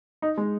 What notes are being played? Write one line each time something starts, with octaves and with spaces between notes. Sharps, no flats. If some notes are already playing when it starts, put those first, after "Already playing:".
D#4
G#3